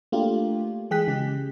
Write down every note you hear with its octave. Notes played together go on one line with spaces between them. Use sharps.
A3 A#3 D4 F4 G4
E3 G#3 G#4 G5 F#6 B6
C#3 G#3 G4